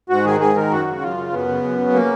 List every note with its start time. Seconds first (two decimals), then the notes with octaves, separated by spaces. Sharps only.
0.09 G#2 F#4
0.25 D#3 G#4
0.40 G#2 G#4
0.56 D#3 A#4
0.71 F#2 F#4
0.86 C#3
1.02 F#2 F4
1.17 C#3
1.33 F#2 B3
1.48 C#3
1.63 F#2
1.79 C#3
1.94 A#3